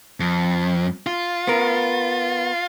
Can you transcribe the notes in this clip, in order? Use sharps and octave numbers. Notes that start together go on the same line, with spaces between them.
F2
F4
B3 A#4